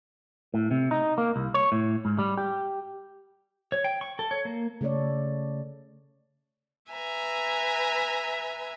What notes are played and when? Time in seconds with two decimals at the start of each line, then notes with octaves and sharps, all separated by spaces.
0.54 A2
0.71 C3
0.91 D#4
1.18 A#3
1.36 C2
1.54 C#5
1.72 A2
2.05 G#2
2.19 G3
2.38 G4
3.72 C#5
3.84 G5
4.01 C#6
4.19 A4
4.31 C#5
4.45 A#3
4.81 C#3 A3 A4 C#5 D5
6.93 B4 E5 G#5 A#5